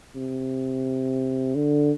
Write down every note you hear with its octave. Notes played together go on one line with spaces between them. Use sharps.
C3
D3